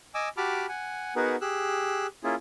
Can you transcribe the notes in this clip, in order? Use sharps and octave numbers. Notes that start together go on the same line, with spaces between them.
D#5 G#5 D6 E6
F#4 G4 A5 B5 D6 F6
F#5 G#5
B3 D#4 F#4 G#4 A#4 B4
G4 G#4 E6 F#6
A#3 C#4 E4 F4 G#4